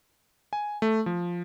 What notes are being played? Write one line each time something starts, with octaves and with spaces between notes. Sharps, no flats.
G#5
A3
F3